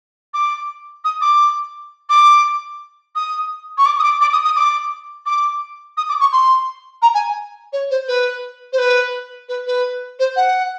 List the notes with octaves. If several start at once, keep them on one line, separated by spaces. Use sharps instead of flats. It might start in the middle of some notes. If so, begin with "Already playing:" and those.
D6
D#6
D6
D6
D#6
C#6
D6
D#6
D6
D6
D#6
D#6
D6
D6
D#6
D6
C#6
C6
A#5
G#5
C#5
C5
B4
C5
B4
B4
B4
C5
F#5